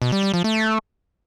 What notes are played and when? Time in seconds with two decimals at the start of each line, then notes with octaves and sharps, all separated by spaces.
0.02 B2
0.12 G3
0.23 G3
0.34 F3
0.44 A3